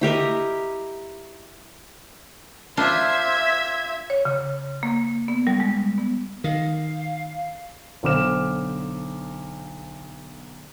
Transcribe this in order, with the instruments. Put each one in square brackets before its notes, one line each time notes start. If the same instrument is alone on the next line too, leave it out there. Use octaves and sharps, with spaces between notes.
[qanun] E4 G4 A#4 D#5
[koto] D4 F4 C5 [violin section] E5 G#6
[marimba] C#5
C#3
A#3
B3
G3
G#3
B3
[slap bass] D#3 [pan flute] F5
[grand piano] B1 D3 C5 D6 F6 E7